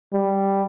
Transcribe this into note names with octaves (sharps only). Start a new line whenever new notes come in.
G3